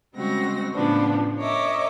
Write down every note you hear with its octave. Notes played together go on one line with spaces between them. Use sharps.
C#3 G3 G#3 C4 F#4 A#6
A2 C#3 F3 B3 D4
A#4 C#5 D#5 E5 D6